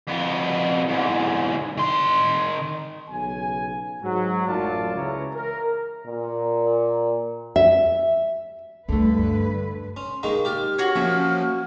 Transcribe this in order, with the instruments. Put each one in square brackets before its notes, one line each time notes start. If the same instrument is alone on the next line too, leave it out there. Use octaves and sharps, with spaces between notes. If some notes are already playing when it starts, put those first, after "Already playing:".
[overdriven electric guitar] F2 B3
E2 G#2
D#3 C6
[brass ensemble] B1 C#3 G#5
G#2 F#3
A1 F#2 F4 D5 A5
C#2 C#3 E3 C#5 A#5
A#4
[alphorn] A#2
[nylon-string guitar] E5
[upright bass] D2 [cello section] G2 B4 [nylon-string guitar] D3 A3
[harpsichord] C#4 [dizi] C6
[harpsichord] D#3 G#3 A#3 [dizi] C#6
[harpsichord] G4 D5 [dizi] F6
[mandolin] F#4 C#5
[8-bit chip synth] F3 A#3 C#4 [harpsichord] E5